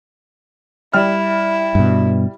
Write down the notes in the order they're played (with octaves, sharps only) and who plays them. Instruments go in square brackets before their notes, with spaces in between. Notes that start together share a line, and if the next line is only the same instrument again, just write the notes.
[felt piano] G3 F6 [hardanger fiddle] E4
[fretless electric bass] G2 B2